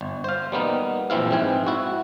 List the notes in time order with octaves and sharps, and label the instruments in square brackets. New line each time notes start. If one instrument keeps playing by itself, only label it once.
[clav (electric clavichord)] G1
C5 F5
G3 A#3 B3 D#4
A#1 E3 C4 E4 F5
G#2 C4 G#5
E4 F#4